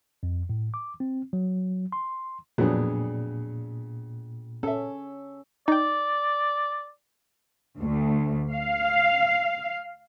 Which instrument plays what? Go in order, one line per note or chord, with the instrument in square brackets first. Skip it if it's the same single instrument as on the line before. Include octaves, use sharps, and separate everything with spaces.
[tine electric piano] F2
A2
D6
C4
F#3
C6
[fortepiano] F2 F#3 B3 [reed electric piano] A#2 [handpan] D4 G#4
[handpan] C#4 [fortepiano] A4 E5
[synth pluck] D#4 G5 [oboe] D5
[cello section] D2
F5